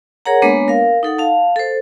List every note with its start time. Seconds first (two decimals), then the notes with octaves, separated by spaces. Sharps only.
0.26 G#4 A#4 C#5 F#5 A#5
0.42 G#3 A#3 B3 D4 B4 C#5
0.68 A#4 F5
1.03 D#4 A4 F#5
1.18 F5 A5
1.56 A4 C5